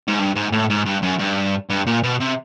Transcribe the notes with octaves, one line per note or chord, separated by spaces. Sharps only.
G#2
G2
G#2
A2
G#2
G2
F#2
G2
G2
A#2
B2
C3